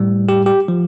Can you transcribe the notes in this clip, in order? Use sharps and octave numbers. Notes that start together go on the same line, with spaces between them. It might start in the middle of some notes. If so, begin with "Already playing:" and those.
Already playing: A2 G3
G4
G4
F3